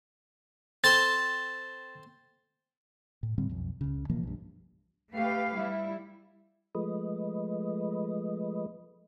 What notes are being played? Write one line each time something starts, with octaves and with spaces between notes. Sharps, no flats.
C4 A4 C6 A6
A2
A2 D3 G3 C4
B1 F2
C#2 C#3
B2 E3 F3 A#3
B1 G2
A3 G4 B4 F5
G3 E4
F3 G#3 A3 B4 D#5